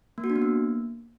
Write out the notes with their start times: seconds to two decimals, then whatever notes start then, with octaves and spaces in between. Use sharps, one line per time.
0.18 A#3
0.24 F#4
0.30 D4
0.36 B3
0.42 A#3